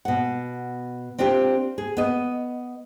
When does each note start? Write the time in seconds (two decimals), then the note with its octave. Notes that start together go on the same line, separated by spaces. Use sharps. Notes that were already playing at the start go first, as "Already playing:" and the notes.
0.05 B2 F#5
1.18 C4 D4 F4 G4
1.78 G#4
1.97 B3 D#5